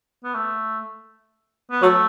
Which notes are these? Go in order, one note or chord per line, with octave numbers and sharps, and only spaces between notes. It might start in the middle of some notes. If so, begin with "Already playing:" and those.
B3
A3
B3
F#3 A3